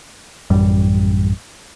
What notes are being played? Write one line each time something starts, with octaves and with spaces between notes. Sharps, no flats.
A1 F#2 G3